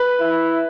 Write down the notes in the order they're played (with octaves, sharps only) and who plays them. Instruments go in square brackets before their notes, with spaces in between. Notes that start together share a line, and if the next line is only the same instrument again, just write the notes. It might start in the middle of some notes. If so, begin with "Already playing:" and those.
Already playing: [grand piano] B4
[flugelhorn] E4